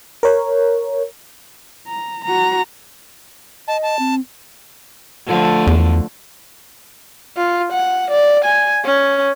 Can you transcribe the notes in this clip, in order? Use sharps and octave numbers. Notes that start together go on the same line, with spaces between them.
A#4 C#5
A#5
F#4 A#5
D#5 A5
A5
C4
D3 F3 A3
E2
F4
F#5
D5
G#5
C#4